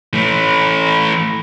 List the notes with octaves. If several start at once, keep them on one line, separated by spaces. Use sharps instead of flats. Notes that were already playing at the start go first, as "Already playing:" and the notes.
E3 A3